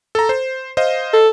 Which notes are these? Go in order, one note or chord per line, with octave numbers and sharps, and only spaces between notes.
A4 A#5
C5
C5 D#5 F5
A4